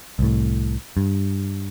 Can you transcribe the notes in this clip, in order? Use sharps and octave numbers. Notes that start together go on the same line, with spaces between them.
C2 A2
G2